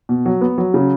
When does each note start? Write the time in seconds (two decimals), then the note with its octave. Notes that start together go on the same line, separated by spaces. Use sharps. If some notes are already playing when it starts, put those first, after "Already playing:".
0.09 B2
0.26 F#3
0.41 B3
0.58 F#3
0.74 C#3